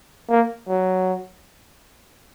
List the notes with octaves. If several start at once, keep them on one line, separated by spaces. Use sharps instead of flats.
A#3
F#3